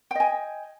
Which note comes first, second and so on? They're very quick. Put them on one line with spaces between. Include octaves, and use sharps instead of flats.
G5 D#5 G#5